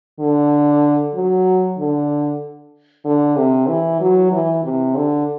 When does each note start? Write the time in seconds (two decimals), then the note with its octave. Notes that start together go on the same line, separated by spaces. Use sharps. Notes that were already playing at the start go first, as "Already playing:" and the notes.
0.20 D3
1.15 F#3
1.79 D3
3.05 D3
3.37 C3
3.68 E3
4.01 F#3
4.32 E3
4.64 C3
4.96 D3